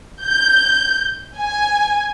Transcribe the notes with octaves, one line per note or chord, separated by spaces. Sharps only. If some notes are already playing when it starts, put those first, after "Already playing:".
G6
G#5